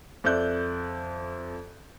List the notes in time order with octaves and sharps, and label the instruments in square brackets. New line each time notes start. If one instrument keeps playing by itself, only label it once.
[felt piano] F2 A4 D5 E5 F#6 G6